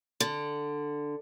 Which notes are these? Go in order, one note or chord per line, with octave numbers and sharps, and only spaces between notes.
D3